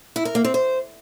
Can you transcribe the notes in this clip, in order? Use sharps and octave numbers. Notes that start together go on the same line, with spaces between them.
E4
A#4
A#3
C4
C5